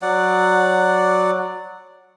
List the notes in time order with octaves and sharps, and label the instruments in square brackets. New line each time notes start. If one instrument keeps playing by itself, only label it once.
[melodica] F#3 D5 F#5